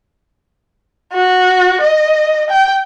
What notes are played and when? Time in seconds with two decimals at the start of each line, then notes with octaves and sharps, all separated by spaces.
1.13 F#4
1.81 D#5
2.50 G5